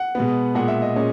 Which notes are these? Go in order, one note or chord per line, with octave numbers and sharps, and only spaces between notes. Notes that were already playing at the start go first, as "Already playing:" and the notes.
Already playing: F#5
B2 G#3 B3
A#2 G#3 B3 F#5
E5
D#5
A#2 G#3 C#4